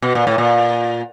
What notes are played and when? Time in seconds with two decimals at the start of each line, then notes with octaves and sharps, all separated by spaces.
0.02 B2
0.15 A#2
0.27 A2
0.38 A#2